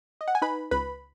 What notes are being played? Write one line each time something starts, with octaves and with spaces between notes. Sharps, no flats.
D#5
F#5
G#5
D#4 B4 B5
C#2 B4 B5